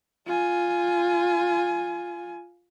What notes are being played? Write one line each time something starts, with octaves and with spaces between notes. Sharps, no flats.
F4 G#5